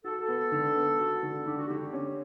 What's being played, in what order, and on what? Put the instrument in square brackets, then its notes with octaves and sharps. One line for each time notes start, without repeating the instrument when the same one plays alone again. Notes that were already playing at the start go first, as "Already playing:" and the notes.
[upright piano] F#4 [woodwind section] A4
[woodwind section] A4
[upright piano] B3
D3
B3
F#4
D3
[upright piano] D3 [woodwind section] G4
[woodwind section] F#4
[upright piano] D3 [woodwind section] G4
[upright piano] C#4